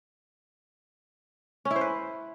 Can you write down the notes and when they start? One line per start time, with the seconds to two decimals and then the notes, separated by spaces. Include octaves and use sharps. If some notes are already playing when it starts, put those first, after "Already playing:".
1.65 C#4
1.71 E4
1.76 C5
1.81 B4